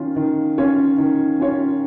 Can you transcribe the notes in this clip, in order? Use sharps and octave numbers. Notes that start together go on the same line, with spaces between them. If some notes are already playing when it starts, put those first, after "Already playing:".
Already playing: D#3 C#4 F4
D#3
C#4 F4 C#5
D#3
C#4 F4 C#5